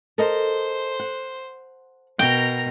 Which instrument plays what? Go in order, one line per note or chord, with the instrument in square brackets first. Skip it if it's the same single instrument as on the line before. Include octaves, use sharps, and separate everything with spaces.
[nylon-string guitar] A4 A#4 D#5 [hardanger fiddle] C5
[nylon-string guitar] F#5
[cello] B2 [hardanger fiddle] A#4 A#5 [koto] G5